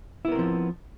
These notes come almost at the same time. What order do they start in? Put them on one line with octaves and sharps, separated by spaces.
E4 B3 A#4 C4 F3